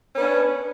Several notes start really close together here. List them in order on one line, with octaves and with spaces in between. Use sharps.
C#4 B3 D4